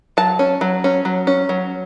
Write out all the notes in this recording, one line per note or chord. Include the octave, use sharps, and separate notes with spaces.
F#3 A5
C#4
F#3
C#4
F#3
C#4
F#3